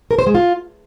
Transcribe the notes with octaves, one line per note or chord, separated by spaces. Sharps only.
A#4
C5
G#3
F4